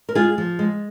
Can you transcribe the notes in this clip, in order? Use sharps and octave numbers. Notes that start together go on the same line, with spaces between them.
A#4
G#3 F4 G#4
F3
G#3